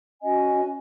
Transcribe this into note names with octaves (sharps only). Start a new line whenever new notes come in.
C#4 F#4 D#5 G#5